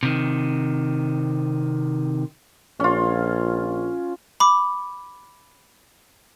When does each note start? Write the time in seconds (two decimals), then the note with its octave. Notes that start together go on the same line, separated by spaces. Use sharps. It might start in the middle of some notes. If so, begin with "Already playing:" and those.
0.03 C3 D#3
2.80 A#1 C#4 F4
4.40 B5 D6